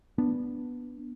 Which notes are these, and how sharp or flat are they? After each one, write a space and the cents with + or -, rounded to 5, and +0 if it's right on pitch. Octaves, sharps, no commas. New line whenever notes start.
B3 -10 D4 +0